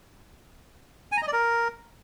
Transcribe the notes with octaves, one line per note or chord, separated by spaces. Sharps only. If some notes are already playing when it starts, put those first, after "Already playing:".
G#5
A#5
D#5
D5
A#4